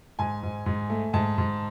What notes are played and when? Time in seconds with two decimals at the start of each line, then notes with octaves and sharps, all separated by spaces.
0.19 G#2 G#5
0.43 G#2
0.66 G#2
0.90 A3
1.13 G#2 A5
1.38 G#2